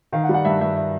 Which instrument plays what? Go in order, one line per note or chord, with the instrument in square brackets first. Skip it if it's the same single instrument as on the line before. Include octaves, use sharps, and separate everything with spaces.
[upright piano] D#3 F5
F#5
G3
F#5
G2 E5
G2 E5
E5